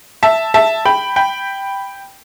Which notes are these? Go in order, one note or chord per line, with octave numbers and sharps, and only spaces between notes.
E5 A5
E5 A5
G5 B5
G5 B5